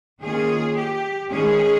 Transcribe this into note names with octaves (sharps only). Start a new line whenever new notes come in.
D#3 A#3 C#4 F4 G#4
G4
D#3 G#3 C#4 G#4